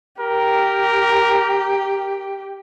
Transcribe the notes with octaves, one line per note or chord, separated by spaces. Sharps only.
G4 A#4